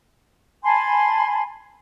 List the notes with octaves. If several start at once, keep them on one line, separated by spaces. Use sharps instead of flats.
G#5 A5 B5 C6